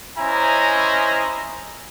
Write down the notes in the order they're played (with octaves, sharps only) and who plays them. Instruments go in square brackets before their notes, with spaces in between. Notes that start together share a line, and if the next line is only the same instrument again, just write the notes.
[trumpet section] C#4 E4 C5 D#5 G#5 A#5